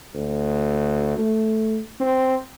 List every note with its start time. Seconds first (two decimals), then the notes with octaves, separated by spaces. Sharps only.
0.14 D2
1.18 A3
2.00 C4